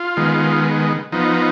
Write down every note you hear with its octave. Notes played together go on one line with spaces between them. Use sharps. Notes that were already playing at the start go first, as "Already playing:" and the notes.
Already playing: F4
D#3 G#3 B3
F3 B3 D#4